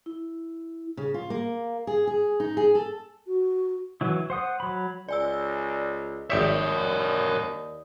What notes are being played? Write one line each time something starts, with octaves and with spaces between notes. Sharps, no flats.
E4
C#3
F4
A#3
G#4
G#4
D#4
G#4
A4
F#4
E3 F#3 E4
C5 F#5 D#6
F#3 B5
C#2 D5 G#5 E6
G#1 D#2 G4 A#4 C#5 D5 E5 D#6